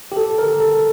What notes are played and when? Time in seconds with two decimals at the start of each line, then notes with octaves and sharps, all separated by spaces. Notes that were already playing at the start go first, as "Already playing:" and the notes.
0.12 G4
0.17 A4
0.38 A#4
0.60 A4